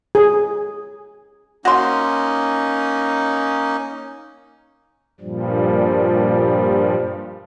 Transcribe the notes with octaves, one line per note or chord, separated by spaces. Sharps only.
G#4
A#3 C#4 D#4 F#4 C6
G2 A#2 F3 G3